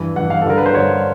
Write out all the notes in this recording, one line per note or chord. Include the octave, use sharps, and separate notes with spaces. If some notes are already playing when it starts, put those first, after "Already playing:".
Already playing: G2 E3
G2 E3 F#5
F5
A4
G2 D3 A#4
B4
C5
G2 D3 C#5